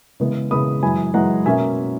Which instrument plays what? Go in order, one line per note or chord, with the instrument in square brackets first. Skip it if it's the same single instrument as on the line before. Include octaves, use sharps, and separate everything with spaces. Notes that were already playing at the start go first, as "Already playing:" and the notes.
[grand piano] C#3 E3 G#3 B3
C#3 E3 G#3 B3 B5 D#6
F#2 E3 G#3 G#5 B5
F#2 E3 G#3 F#5 A#5
B2 A#3 C#4 E5 G#5